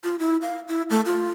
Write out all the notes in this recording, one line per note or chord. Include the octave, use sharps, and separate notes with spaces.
F4
E4
F5
E4
A3
F4